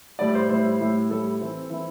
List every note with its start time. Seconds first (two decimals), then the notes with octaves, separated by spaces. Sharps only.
0.19 A2 G3 E4 D5
0.35 C5
0.49 A2 G3 E4 C5
0.80 A2 G3 E4
1.09 A2 G3 E4 A4
1.40 E3 C4 E4
1.70 E3 C4 E4